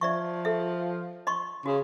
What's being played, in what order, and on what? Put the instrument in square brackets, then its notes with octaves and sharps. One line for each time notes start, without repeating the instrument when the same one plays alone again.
[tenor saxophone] F3 [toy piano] D5 E5 C#6
[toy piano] A4 E5
D#5 C6 C#6
[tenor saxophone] C#3 [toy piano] F#4